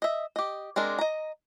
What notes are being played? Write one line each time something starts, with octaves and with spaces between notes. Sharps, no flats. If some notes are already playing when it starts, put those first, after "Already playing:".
D#5 E5
G4 D#5
G#3 C4 D4 A#4
D#5 A#5